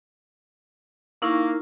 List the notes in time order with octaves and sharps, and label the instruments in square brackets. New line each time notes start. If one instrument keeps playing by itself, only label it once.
[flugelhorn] A#3 [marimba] D#4 E4 C#6